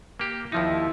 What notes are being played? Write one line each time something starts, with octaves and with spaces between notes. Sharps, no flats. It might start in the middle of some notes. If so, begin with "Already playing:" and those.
A#3 G4
D#2 F3 D#4 E4